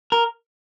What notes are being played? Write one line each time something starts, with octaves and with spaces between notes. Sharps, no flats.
A#4